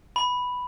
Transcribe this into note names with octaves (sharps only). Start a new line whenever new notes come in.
B5